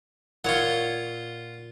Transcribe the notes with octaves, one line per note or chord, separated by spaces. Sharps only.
A#2 F4 C#5 F#5